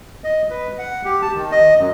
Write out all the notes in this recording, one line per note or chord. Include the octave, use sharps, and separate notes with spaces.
D#5
B4
F#5
G4
A5
D#3
D#5
F#2